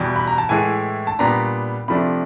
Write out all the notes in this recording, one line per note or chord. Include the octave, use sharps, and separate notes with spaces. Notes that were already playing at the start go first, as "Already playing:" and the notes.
Already playing: E2 B2 G3
B5
A#5
A5
A2 E3 G#3 G#5
A5
A#2 G3 B3 D4 A#5
C3 F3 A3 D4 B5